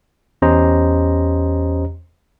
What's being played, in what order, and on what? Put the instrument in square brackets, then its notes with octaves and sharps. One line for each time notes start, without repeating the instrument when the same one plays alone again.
[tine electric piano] E2 C#4 G4 C5 D#5 A#5